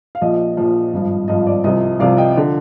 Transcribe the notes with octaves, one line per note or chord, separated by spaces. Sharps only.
F5
A#1 A#2 F3 D#5
A#1 A#2 F3
G#1 G2 F3
G#1 G2 F3 D#5
D5
C2 C3 F3 D#5
C2 C3 F3 D5 F5
D#5 G5
D3 F3